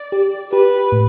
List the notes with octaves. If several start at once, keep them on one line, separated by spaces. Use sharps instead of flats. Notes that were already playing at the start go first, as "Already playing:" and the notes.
Already playing: D5
G4
G4 B4
A2